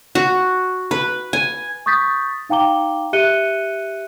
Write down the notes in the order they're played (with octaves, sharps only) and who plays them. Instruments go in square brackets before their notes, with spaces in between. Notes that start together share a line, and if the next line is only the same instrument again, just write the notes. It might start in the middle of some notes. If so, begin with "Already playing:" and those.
[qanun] F#4
B4
G#5
[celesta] C#6 D#6 G6 A6 B6
D#4 F5 G5 A#5 D6 G7
G4 E5 F#6 C#7 D#7 G7